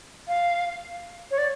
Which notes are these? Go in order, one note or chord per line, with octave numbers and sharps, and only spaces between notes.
F5
C#5
D5